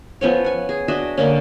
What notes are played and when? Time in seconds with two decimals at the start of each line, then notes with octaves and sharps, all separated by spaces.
0.21 F3 B3 C#4 C#5
0.44 F#5 G#5
0.69 G#4
0.88 D4 F#4 D#5 E5
1.18 D3 A#3 C#4